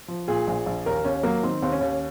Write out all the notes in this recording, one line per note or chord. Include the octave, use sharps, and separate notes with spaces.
F3
A#2 G#4
A#1
A#1
D#2 A#4
D#2 C#4
F#3 A#3
D#3 C4
D#2 C4
C#4
D#2